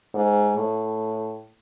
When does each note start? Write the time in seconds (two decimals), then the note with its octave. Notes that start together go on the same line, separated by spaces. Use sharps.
0.14 G#2
0.56 A2